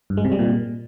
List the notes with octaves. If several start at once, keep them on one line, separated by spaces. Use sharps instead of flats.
G2
G#3
C3
G3
A#2